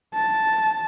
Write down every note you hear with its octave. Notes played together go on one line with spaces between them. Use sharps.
A5